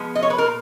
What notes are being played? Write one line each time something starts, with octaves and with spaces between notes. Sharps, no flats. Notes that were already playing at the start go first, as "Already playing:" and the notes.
Already playing: F3 G#3 B3
D#5
C#5
B4
A#4
A#2